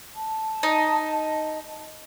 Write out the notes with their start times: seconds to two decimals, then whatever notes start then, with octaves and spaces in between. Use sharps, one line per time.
0.15 A5
0.63 D#4